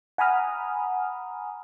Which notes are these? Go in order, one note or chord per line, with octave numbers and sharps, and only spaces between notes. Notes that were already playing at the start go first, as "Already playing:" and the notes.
F#5 G#5 A#5 B5 D#6 F6